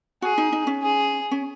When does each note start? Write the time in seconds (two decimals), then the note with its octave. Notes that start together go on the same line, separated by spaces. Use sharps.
0.22 F#4 G#4
0.38 D#4
0.52 D#4
0.67 C#4
0.82 G#4
1.31 C#4